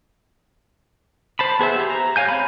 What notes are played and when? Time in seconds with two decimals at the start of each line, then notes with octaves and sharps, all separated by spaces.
1.39 C5 A5 B5
1.59 B3 G#4 C5 E5
1.76 G4
1.90 A#5
2.16 C#5 F5 G#5 G6
2.29 C4 A#5 B5